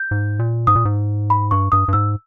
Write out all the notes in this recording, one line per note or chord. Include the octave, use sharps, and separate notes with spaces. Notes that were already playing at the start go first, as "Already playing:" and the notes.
Already playing: G6
G#2
A#2
G#2 D#6
A#2
G#2
B5
G2 C#6
G2 D#6
G2
G#2 E6